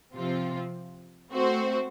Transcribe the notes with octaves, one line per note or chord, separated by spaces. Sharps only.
C3 F3 C4 F4
A3 C4 F#4 C5